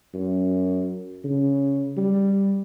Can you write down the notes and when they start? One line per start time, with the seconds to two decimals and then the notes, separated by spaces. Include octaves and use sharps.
0.14 F#2
1.24 C#3
1.97 G3